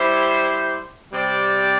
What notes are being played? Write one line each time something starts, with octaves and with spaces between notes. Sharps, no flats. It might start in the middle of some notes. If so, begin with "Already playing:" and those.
Already playing: G3 E4 G4 C5
C3 G3 C4 G4 D5